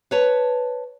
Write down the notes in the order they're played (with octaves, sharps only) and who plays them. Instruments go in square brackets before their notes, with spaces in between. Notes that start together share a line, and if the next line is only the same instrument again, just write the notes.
[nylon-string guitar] B4 C#5 A5